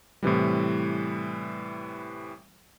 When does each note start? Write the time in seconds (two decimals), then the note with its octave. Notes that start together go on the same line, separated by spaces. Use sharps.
0.23 A2 C3 E3 G3